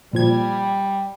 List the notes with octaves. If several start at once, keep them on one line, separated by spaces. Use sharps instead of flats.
A#2 F3 G3 G#6